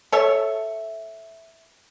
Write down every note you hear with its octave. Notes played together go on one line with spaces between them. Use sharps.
A4 C#5 E5